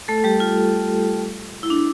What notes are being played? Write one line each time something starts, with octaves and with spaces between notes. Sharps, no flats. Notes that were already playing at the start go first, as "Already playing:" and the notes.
A3 A4
G3 G4
F4
E4
D4